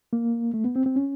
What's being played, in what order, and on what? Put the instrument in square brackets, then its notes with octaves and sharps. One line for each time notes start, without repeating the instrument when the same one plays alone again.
[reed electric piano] A#3
A3
B3
C4
C4
C#4